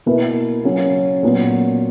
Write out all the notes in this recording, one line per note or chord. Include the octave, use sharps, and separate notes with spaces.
B2 A#3 E4 B4
C#3 F#3 C#4
A#2 F#3 B3